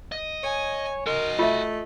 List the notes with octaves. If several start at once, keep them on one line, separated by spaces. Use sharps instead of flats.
D#5
C#5 G#5
F#4 A#4 D#5 C6
A3 F4 E5